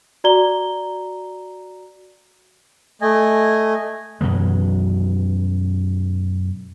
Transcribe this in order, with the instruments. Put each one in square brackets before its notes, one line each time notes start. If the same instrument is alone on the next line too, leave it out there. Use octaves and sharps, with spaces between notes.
[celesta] F#4 D5 A#5 G7
[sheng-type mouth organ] A3 D#5 G#5
[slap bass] F#2 B2 E3 G#3